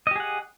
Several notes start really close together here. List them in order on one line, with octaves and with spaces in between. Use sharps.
D#5 G4 G#4 F#5